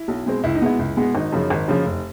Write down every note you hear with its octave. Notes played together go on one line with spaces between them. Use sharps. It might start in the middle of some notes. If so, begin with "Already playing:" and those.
Already playing: E4
B1
B2 G#3 C4
C#2 E4
D#4
B2 G#3 B3 E4
C#2
B2 G#3 B3
G#1 D#4
F#2 C#3 F3
G#1
F#2 C#3 F3
F1